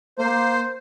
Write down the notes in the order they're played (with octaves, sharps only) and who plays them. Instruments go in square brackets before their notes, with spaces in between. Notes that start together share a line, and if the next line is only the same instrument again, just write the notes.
[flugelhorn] A#3 [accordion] C5